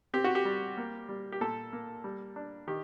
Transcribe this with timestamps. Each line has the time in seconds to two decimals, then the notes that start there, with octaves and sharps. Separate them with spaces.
0.14 C4 G4
0.24 F#4
0.35 G4
0.45 G3
0.77 A#3
1.09 G3
1.32 G4
1.41 A#2 A4
1.73 A#3
2.04 G3
2.36 D4
2.67 D#3 G4